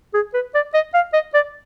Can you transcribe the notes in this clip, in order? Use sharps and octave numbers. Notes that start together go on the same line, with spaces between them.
G#4
B4
D5
D#5
F5
D#5
D5